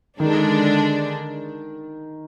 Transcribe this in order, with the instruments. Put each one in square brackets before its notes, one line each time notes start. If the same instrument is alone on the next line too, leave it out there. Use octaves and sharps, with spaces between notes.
[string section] D3 G#3 D4 [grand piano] D#3